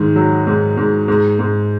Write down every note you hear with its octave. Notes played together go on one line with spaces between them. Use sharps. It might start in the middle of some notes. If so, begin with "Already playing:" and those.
Already playing: G#2 D#3
F#3
G#2
G#2
G#2
G#2